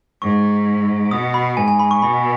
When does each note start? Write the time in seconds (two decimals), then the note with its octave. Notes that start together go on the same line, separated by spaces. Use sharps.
0.22 G#2 C#6
1.11 B2 D#6
1.34 B5
1.57 G#2 G#5
1.68 G#5
1.80 B5
1.91 C#6
2.02 B2 B5